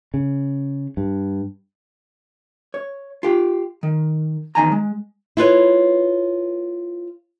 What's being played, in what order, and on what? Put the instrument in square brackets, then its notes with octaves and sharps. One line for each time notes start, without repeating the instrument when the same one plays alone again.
[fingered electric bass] C#3
G2
[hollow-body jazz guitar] C#5
F4 G4
D#3
E2 G2 D#3 G#5 A#5
G#3
[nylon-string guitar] E4 F4 B4 C#5